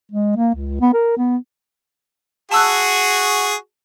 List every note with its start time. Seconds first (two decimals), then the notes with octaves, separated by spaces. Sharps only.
0.12 G#3
0.36 A#3
0.55 C#2
0.81 B3
0.94 A#4
1.17 B3
2.51 F#4 G#4 A5 E6 F#6